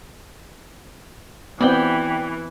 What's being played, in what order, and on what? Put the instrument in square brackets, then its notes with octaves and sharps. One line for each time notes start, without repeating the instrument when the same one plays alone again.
[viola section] E3 [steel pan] B3 C4 [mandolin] D5 G5